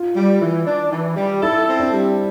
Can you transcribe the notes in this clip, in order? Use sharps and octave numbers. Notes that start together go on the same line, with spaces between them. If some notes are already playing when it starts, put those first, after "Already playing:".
Already playing: F4
G3
E3
D4
E3
G3
E4 A4
C4
D4
G3